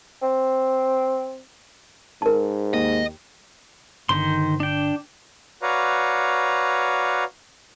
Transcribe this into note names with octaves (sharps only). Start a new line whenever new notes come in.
C4
G#2 A#4 A5
D#2 D#5
G1 D3 D#3 C5 C6
D4 G5
F#4 B4 C#5 D5 F5 A#5